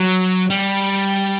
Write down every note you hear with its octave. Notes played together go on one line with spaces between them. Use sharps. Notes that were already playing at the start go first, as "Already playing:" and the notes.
Already playing: F#3
G3